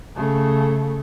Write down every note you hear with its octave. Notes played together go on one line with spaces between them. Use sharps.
C#3 A3